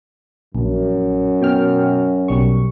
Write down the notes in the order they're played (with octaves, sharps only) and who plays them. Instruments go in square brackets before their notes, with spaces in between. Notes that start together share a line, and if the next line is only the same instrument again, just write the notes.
[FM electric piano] A#1 [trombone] F#2
[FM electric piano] B2 G5 F6
B1 G3 C#6